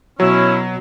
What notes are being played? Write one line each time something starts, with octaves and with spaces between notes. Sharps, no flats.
B2 F#3 C#4 E4